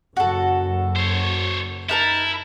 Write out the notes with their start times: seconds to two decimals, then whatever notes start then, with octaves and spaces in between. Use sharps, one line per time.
0.17 F#1 F#2 F#4 A4
0.96 C5 C#5
1.89 D#4 E4 A#4 A5